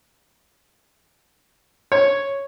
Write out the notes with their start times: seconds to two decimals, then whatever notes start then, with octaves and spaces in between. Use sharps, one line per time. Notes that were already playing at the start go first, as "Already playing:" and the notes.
1.92 C#5